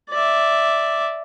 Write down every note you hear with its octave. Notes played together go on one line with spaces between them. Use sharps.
D5 E5